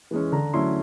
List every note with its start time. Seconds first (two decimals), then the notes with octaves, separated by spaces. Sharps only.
0.11 E3 G#3 C#4
0.32 D3 A#5
0.54 F#3 A3 C#4 E4 C6